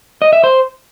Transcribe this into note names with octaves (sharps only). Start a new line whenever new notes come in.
D#5
E5
C5